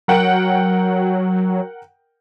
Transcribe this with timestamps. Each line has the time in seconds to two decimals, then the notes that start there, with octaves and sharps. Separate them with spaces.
0.08 F#3 A#4 F#5 G5